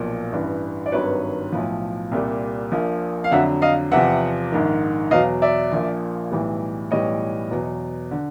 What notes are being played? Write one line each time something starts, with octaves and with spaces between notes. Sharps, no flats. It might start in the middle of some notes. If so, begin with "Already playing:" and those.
Already playing: B1 A#2 F3
A1 G2 E3
D5
G#1 G2 D#3 F#3 B4 C#5
B1 A2 F3
C2 A#2 G3
A#1 A#2 F3
F5
F2 D3 F#3 E5 F#5
D#5 F5
E2 C3 F3 E5 F#5
A#1 G#2 D#3
E2 B2 F#3 D#5 F5
D5 E5
A#1 A#2 F3
B1 A2 E3 G3
B1 A2 E3 G3 C#5 D#5
E2 B2 F#3
D3